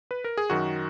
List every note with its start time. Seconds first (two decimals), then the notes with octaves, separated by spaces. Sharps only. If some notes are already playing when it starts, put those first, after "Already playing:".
0.11 B4
0.24 A#4
0.37 G#4
0.50 F#2 D#3 F#4